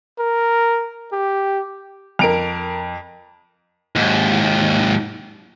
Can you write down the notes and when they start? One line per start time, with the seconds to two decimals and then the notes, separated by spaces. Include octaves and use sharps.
0.19 A#4
1.13 G4
2.19 F2 A#4 D7 F7
3.96 D#2 G#2